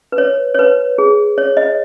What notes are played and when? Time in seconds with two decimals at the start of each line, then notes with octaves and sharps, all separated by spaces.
0.12 B4
0.18 C#5
0.54 C#5
0.59 B4
0.98 G#4
1.38 C#5
1.57 D#5